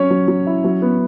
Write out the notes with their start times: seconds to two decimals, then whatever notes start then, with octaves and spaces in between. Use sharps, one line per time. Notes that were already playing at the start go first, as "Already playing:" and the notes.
Already playing: F#3 C#4 C#5
0.10 F#3
0.28 F#3
0.47 E4
0.64 F#3
0.82 B3